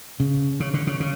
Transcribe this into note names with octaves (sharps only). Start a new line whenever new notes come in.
C#3
C#3
D3
C#3
C#3